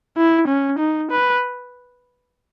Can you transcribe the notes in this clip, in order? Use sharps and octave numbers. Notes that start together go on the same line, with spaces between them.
E4
C#4
D#4
B4